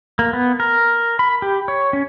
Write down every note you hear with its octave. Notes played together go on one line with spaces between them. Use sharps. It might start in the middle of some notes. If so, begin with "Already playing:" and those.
A#3
B3
A#4
B5
G4
C#5
C#4